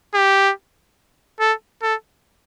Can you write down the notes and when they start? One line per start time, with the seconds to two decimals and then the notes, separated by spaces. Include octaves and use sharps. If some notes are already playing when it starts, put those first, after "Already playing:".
0.14 G4
1.40 A4
1.82 A4